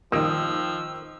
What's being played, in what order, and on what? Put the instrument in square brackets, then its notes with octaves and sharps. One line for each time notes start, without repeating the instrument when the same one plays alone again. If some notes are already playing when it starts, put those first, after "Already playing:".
[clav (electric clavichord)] A#2 G3 A#3 [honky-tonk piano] D#3 D#6 [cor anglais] F3 [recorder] E6